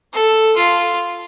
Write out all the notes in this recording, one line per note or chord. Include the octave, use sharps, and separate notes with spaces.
A4
F4